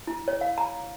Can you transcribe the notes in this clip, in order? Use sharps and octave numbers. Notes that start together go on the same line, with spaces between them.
E4
C#5
F5
A#5